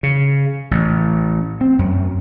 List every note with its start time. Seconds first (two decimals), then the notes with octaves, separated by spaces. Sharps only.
0.03 C#3
0.71 A1
1.61 C4
1.79 F#2